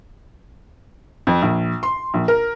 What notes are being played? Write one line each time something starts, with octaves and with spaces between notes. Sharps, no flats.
F2
A#1
C6
A#1
A#4